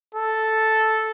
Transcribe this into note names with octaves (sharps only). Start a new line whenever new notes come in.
A4